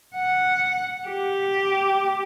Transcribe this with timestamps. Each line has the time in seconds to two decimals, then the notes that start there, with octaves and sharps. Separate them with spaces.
0.17 F#5
1.07 G4